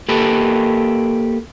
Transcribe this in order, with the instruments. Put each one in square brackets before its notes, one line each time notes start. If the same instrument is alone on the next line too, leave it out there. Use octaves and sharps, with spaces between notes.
[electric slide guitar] A#3 G4 A4 B4